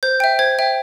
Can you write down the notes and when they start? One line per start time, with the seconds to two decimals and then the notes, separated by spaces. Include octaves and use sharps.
0.03 C5 G6
0.20 E5 G5
0.39 C5 G#6
0.59 E5 G5